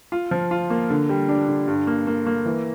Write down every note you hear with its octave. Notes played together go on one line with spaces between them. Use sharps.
F4
F3
F4
A#3
D3
G3
D4
D3
G2
A#3
A#3
A#3
E3